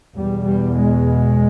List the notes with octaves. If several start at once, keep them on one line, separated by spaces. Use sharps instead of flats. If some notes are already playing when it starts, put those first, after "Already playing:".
E2 B2 G3
G3
G#3